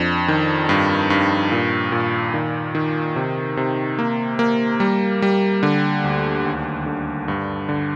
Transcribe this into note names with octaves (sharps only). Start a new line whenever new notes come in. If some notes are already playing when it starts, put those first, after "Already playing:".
Already playing: F2 D4
D#3
G2
G2
A#2
A#2
D#3
D#3
C3
C3
A#3
A#3
G3
G3
D3
D2
D#2
D3
G2
D3